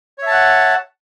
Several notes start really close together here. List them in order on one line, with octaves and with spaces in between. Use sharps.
C#5 E5 A5 F#5